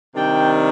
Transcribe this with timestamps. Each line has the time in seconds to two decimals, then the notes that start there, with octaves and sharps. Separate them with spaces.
0.15 C3 D#3 G3 D4 G5